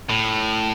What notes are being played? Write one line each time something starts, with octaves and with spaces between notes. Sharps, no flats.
A2